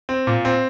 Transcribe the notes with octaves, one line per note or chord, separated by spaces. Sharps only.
C4
A#2
C4